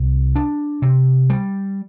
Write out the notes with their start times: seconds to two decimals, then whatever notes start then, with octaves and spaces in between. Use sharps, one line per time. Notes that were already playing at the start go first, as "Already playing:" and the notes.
Already playing: C2
0.35 D4
0.82 C3
1.30 G3